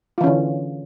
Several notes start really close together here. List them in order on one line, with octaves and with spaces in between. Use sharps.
F4 E3 C#4 D3